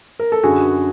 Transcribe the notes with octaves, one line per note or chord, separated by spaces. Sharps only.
A#4
A4
F#2 D3 F#4 G#4